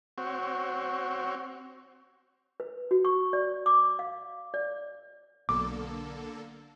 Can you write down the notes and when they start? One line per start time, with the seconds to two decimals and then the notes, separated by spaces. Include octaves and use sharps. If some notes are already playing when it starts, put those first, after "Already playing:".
0.18 C4 F#4 C#5
2.60 B4
2.91 F#4
3.05 C#6
3.33 D5
3.66 D6
3.99 F5
4.54 D5
5.49 B1 B2 D3 A#3 A4 D6